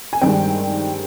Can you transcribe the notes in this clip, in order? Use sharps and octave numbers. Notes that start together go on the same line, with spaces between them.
G#5
G2 D#3 G#3 C4 G5